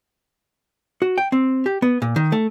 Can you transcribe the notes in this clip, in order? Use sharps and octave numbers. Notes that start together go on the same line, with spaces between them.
F#4
G5
C4
G4
B3
A#2
D#3
A3